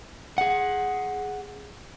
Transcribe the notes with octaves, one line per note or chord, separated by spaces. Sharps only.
G#4 F#5